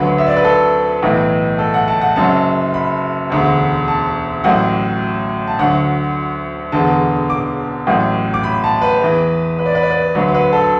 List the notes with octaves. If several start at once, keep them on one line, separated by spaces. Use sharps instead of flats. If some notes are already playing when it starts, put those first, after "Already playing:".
Already playing: D2 D3 F#3 B4
E5
D5
B4
A4
B1 A2 E3
A4
F#5
A5
F#5
F#1 F#2 F#3 A5
B5
E1 D2 D3
A5
A1 A2 F#3 F#5
A5
D2 D3 F#3 F#5
E1 E2 D3 A5
D6
A1 A2 F#3
D6
B5
A5
B4
E2 E3
B4
D5
B4
D5
B4
D2 D3 F#3 B4
B4
A4